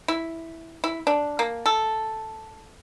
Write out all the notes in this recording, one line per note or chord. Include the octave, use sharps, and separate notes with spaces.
E4
E4
D4
A#3
A4